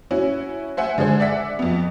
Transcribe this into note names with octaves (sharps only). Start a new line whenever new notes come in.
C#4 E4 F#4
C5 E5 F#5 G#5
D3 G#3 G#4 C5
D5 E5 F#5 B6
F2 B3